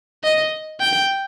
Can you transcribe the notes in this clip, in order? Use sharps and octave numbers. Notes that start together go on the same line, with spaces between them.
D#5
G5